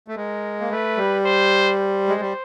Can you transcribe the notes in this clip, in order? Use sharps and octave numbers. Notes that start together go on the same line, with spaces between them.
A3
G#3 A#4
A#3
A3 B4
G3
C5
C5
G#3
G3